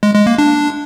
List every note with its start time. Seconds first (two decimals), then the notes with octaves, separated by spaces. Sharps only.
0.03 G#3
0.15 G#3
0.27 A#3
0.38 D4